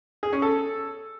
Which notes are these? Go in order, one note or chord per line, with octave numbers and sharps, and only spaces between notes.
G#4
C#4
A4